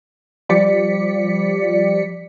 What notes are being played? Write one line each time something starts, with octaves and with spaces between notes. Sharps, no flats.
F3 G3 D5 B6 C#7